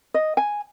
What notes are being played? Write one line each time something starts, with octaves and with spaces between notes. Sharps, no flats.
D#5
G#5